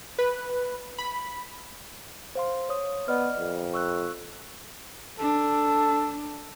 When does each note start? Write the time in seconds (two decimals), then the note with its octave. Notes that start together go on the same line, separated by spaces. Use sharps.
0.19 B4
0.99 B5
2.35 C5 F5 C6
2.69 C#5 D#6
3.08 B3 D5 D#5 F6
3.38 F2
3.74 C#6 E6 F#6
5.19 D4 A4